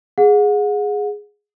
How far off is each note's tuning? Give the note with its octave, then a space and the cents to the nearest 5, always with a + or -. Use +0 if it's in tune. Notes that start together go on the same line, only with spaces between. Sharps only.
G#4 +0 F#5 -35